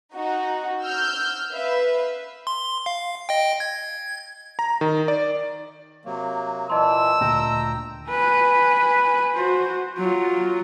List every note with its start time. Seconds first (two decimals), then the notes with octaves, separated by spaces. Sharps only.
0.14 D#4 F#4
0.82 E6 F6 G6
1.52 B4 E5 F5
2.47 C6
2.86 F5
3.29 D#5 G5
3.60 G#6
4.59 A#5
4.81 D#3
5.08 D5
6.05 C3 F#3 A#3
6.70 A#2 E3 D#5 A5 C6 E6
7.21 D2 A#2 G5 A#5
8.10 B4 G#5
9.35 F#4 C5
9.98 F#3 F4